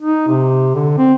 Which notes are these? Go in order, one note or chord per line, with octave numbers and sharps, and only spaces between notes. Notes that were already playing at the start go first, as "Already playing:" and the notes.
D#4
C3
D3
C4